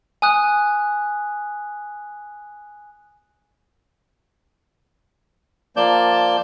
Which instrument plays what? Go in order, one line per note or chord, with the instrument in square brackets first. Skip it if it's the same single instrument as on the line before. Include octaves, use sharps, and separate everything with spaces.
[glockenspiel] G#5 D#6 F#6
[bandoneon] F3 A#3 D5 A5 G6